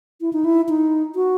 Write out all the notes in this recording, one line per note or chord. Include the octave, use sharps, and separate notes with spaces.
E4
D#4
E4
D#4
F#4